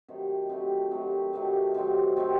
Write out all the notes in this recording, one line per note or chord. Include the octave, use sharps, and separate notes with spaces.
C3 D#3 F#3 A3
C3 D#3 F#3 A3
C3 D#3 F#3 A3
C3 D#3 F#3 A3
C3 D#3 F#3 C4
C3 D#3 F#3 C4